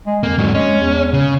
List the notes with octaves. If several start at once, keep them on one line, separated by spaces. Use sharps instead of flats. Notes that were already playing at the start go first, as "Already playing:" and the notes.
G#3
F2 A#3
G#2 F#3
G#3 C#4
E2
C#3